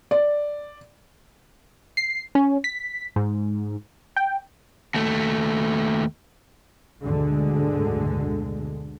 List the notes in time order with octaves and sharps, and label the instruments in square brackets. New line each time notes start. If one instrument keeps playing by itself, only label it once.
[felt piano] D5
[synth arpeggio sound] C7
C#4
B6
G#2
G5
[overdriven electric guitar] D#2 A3
[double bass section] F#1 D2 G#2 B2 D3 G#3